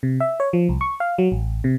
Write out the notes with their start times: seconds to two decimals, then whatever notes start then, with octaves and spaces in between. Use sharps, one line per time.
0.03 C3
0.20 E5
0.40 C#5
0.53 F3
0.69 C2
0.81 C#6
1.00 F5
1.18 F#3
1.32 A1
1.64 C3